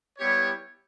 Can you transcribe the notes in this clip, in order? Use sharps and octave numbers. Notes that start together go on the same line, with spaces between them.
G3 B3 E4 G4 C#5